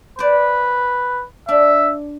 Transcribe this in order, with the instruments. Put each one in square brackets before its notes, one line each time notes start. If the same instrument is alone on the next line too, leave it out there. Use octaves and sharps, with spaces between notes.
[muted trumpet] B4 [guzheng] C5 D5
[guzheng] D4 [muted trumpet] E5